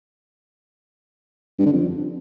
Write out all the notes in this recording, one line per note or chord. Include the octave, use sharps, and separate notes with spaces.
G2
D3
F2